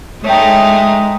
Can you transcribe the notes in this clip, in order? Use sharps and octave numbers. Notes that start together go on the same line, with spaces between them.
G#3 A3 D#4 C#5 G5